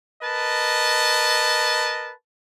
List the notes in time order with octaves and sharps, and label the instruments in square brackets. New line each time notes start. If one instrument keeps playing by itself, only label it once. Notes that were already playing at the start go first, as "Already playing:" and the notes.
[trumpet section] A#4 B4 D#5 A5